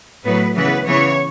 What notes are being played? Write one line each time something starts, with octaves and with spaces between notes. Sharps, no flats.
A2 F#3 B3 B4
C#3 E3 B3 B4
C#3 E3 B3 C#5